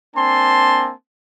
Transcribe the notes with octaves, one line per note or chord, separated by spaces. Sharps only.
A#3 C4 D4 G#5 A5 C6